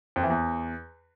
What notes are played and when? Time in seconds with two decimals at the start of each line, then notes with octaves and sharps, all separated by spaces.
0.16 F2
0.23 E3
0.30 E2